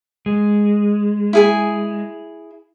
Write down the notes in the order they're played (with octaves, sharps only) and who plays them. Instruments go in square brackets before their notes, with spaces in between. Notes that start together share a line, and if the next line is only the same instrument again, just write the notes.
[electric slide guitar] G#3
[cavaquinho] E4 G#4 G#5